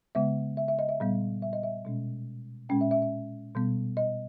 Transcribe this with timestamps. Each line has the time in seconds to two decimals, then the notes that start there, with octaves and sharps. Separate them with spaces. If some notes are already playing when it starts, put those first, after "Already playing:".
0.15 C#3 G#3 B3 E5
0.57 E5
0.68 E5
0.79 D#5
0.89 E5
1.00 A#2 G3 B3
1.42 E5
1.53 D#5
1.63 E5
1.85 B2 G#3 C#4
2.69 A#2 G#3 C#4 G5
2.81 E5
2.91 E5
3.02 E5
3.55 B2 G3 B3
3.97 D#5